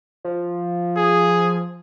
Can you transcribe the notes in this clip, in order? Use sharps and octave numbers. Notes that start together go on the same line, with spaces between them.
F3
G#4